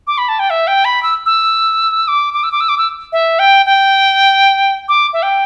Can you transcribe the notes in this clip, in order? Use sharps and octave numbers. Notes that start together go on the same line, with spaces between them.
D6
B5
A5
G5
E5
G5
B5
E6
E6
D6
D6
E6
D6
E6
D6
E6
E5
G5
G5
D6
E5
G5